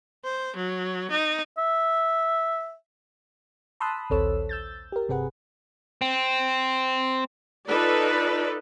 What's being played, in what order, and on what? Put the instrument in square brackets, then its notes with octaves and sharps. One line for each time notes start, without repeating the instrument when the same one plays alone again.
[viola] C5
F#3
D#4
[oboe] E5
[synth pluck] A5 B5 C6 D#6 E6 F#6
A#1 D#2 C4 A4 C#5 E6
E6 G6 A6
G4 A#4
G1 C3 C4 G#4 B4 F#5
[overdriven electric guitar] C4
[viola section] D#4 F4 A4 B4 D5